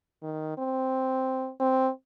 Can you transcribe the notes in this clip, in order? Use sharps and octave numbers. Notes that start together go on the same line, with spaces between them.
D#3
C4
C4